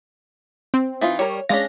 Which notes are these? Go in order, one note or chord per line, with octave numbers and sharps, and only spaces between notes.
C4
E3 D#4 F4
G3 A#4 C#5
G#3 C#4 D4 F5 A#6